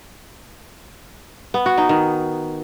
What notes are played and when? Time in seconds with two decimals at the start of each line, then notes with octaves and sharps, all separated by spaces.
1.54 B3
1.66 F#4
1.78 D#4
1.89 D#3